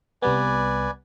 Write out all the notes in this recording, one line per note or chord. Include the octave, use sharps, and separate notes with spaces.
C2 G3 B3 B4 D5 G#5